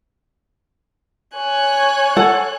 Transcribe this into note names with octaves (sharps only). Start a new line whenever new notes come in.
C#5 G#5 F#6
A4 F#5